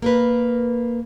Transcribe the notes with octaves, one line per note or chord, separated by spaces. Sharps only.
A#3 A#4 B4